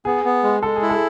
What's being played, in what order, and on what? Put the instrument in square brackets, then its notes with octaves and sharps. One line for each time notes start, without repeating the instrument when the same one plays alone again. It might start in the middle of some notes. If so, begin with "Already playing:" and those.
[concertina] B3 [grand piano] G#4
[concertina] B3
G#3
[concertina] G#3 [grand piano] A4
[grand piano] G#4
[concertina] E4
[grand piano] A4